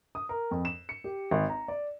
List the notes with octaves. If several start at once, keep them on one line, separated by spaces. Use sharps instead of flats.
D#6
A#4
F2
E7
C#7
G4
G#1
A#5
D5